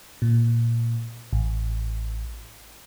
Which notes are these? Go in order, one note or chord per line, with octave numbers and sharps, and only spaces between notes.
A#2
A1